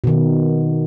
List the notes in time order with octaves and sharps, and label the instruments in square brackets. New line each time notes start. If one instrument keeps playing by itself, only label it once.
[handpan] B2 D#3